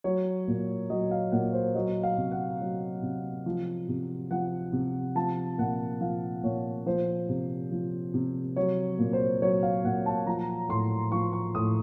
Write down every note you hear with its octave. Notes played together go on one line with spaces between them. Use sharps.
F#3 C#5
A#2
F#3 D#5
F5
A#2 F#5
C5
F#3 D#5
F5
C3
F#5
F#3
C3
F3
C3
F3 F#5
C3
F3 A5
A#2 F#5
F3 F5
A#2 C#5
F3 C5
C3
F3
C3
F#3 C#5
A#2
C5
F#3 C#5
F5
A#2 F#5
A5
F3 A#5
A2 C6
F3 C#6
C#6
A2 D#6